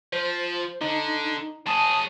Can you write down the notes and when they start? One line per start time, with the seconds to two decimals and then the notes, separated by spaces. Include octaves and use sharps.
0.13 F3 C5
0.81 D3 D#4
1.67 F#3 G#4 A5 D#6